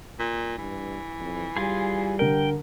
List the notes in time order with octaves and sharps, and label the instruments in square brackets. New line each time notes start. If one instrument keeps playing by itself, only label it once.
[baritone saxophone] A#2
[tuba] G2 [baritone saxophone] E3
[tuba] F2
[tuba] G3 [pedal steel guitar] F4 G#4
[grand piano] D3 A#4 [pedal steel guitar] G5